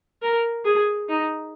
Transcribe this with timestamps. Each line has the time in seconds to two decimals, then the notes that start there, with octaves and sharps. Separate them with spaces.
0.22 A#4
0.65 G#4
1.09 D#4